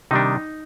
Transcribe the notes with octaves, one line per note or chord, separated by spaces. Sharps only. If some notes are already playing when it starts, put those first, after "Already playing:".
C3 D#3 G3 D4 D#4